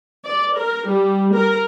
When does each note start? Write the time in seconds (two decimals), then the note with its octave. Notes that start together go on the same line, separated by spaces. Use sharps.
0.25 D5
0.56 A#4
0.89 G3
1.34 A#4